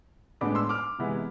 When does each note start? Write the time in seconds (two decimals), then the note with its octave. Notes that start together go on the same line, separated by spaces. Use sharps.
0.41 A2 G#3 B3 D4 B5 D6
0.55 C6 E6
0.69 D6 F6
0.99 C3 E3 G#3 B3 E4